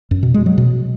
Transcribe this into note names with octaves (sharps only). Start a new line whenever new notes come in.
F#2
B2
G#3
F#3
B2